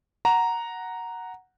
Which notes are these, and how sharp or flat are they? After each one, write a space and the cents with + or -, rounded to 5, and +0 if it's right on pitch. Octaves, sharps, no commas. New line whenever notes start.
F#5 +0 A#5 +0